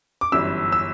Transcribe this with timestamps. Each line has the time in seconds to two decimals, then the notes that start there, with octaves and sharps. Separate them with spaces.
0.21 D6
0.32 G1 F#2 E3 G3 E6
0.72 E6